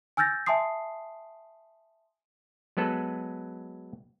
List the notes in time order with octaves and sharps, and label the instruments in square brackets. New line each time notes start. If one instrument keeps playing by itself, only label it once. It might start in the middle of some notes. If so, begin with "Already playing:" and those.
[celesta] G#5 E6 F6 G6 A6 A#6
E5 G#5 A5 C6 D#6 C7
[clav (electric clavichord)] F#3 G#3 B3 A4 B4